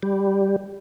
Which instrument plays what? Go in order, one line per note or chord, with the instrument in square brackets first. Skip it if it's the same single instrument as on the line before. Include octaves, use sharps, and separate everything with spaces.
[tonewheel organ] G3